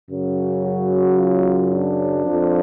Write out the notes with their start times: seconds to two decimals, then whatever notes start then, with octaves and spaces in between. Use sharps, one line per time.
0.10 F#2 C#3 F#3
0.65 F#4
1.18 F4
1.72 D4
2.26 F2 F3